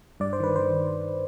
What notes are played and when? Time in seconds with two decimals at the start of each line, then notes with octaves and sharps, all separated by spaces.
0.20 G2 D5
0.33 C5
0.40 D#3 B4
0.56 D#3 C5